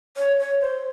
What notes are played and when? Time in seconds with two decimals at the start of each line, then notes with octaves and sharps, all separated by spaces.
0.17 C#5
0.40 C#5
0.61 C5